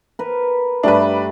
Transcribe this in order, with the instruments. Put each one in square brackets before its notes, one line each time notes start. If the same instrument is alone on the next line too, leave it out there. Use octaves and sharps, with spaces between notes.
[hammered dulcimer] A#4 B4
[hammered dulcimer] G2 G3 A3 [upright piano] D4 B4